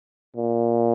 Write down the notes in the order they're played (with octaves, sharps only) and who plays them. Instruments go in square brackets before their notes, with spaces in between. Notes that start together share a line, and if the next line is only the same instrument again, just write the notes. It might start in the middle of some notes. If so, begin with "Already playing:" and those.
[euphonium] A#2